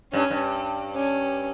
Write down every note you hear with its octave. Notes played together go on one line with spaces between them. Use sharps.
G2 C#4
G2
C#4